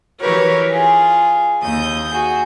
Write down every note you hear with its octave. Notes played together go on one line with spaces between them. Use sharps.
E3 F#4 G4 A#4 B4 C#5
F4 G#4
D#2 D#6 G6
F#4 G#4